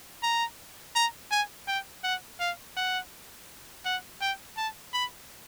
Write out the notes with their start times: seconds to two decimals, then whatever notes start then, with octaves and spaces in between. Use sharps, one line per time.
0.23 A#5
0.95 A#5
1.31 G#5
1.68 G5
2.04 F#5
2.40 F5
2.77 F#5
3.85 F#5
4.21 G5
4.57 A5
4.94 B5